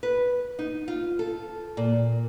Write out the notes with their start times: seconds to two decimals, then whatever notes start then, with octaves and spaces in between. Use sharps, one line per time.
0.03 B4
0.59 D#4
0.88 F4
1.19 A4
1.77 A#2